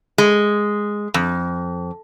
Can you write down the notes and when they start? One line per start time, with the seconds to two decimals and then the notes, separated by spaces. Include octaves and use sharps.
0.18 G#3
1.14 F2